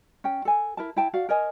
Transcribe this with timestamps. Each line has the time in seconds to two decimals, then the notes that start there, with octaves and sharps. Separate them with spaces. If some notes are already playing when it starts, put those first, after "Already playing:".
0.24 C#4 G5
0.45 A4 G#5
0.77 E4 A#4 A5
0.96 E4 G5 A5
1.13 F#4 D5 F5
1.29 A#4 C#5 D#5 G#5